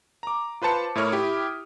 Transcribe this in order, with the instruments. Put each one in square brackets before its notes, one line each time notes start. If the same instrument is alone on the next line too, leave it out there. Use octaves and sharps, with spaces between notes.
[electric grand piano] A#5 D6
F4 B4 C5 A5 C#7
A2 E4 A#4 C#5 D#6 F6
E4 G4